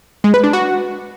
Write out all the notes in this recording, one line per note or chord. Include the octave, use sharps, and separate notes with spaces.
G#3
B4
D4
F#4